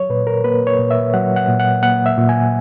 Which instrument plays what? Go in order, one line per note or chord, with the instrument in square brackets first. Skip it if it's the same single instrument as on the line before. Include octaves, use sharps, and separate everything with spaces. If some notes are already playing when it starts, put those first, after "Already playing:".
Already playing: [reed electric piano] F#3 C#5
A#2 B4
A#4
A#3 B4
C#5
A#2
E5
F#3 F#5
F#5
A#2
F#5
A#3 F#5
E5
A#2
G#5